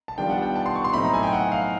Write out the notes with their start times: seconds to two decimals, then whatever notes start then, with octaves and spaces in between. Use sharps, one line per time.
0.08 A5
0.18 D#3 G3 B3 D4 F4 G5
0.30 F#5
0.42 G5
0.56 A5
0.66 C6
0.76 C#6
0.84 C6
0.93 A2 F#3 A3 C4 D#4 B5
1.04 A#5
1.14 G#5
1.23 G5
1.33 F#5
1.52 F5